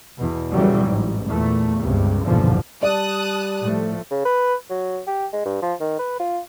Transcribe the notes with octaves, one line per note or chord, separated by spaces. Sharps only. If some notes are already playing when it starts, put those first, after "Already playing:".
E2 B2
A#2 C#3 E3 F#3 G3
A1 G#2
E2 A#2 A3
G1 C#2 G2 C3
B1 E2 G2 A#2 D3 F3
G3 D5 A5 D#6 F#6
A2 F3 A3
C#3
B4
F#3
G4
G#3
G2
F3
D#3
B4
F4